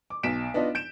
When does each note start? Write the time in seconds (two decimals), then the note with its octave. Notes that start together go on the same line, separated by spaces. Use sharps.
0.10 D6
0.23 B1 B2 B6 D7 E7
0.54 B3 D4 D#4 F4 D#5
0.75 G6 D7 E7